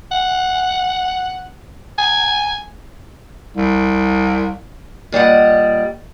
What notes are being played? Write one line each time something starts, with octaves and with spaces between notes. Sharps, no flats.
F#5
G#5
C2
A#2 G3 D#5 F#5